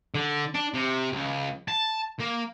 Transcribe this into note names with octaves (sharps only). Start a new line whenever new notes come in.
D3
D4
C3
C#2
A5
A#3